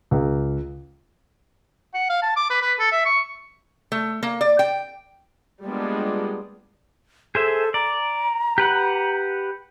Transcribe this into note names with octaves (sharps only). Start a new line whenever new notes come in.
C#2
F#5
F5
A5
D6
B4
B4
A4
E5
C#6
A3
A#3
D5
G5
G3 G#3 A#3 B3 D4 F4
G#4 A4 C5 E5
D5 A#5
G4 B4 F#5